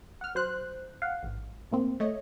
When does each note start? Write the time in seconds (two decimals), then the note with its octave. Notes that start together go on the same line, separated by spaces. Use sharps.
0.21 F#5 F6
0.35 F#3 C5 F#6
1.02 F5 F#5
1.22 A1 G#2
1.71 A2 A#3 C4
2.00 A3 C#5 D#5